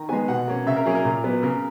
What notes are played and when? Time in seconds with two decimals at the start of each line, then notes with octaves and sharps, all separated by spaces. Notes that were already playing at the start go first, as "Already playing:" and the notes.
Already playing: D#3 A#5
0.09 G#3 B3 G#5
0.28 B2 F#5
0.47 A#3 C#4
0.67 C#3 E5
0.76 A#4
0.85 F#3 A#3 C#4 G#4
0.95 A#4
1.05 A#2
1.24 F#3 B3
1.43 C#3 A#4